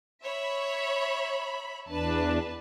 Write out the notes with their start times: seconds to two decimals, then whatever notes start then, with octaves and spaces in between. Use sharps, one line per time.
0.24 C#5 E5 B5
1.89 E2 D4 B4 A5